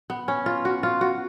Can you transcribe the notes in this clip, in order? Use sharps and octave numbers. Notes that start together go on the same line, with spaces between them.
B3
C#4
F4
F#4
F4
F#4